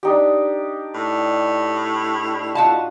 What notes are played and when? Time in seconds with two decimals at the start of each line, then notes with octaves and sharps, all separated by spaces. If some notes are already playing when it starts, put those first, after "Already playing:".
0.03 D4 D#4 G4
0.94 A2
2.55 F4 F#4 D#5 A5